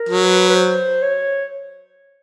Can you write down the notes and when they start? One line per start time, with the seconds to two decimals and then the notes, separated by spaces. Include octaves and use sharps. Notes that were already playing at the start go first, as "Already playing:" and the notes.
Already playing: A#4
0.09 F#3
0.24 B4
0.49 B4
0.55 C5
1.02 C#5